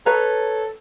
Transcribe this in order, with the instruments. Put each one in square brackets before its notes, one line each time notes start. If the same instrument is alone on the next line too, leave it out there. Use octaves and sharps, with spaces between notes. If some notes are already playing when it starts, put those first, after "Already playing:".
[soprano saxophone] A4 [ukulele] B4 C#5 A#5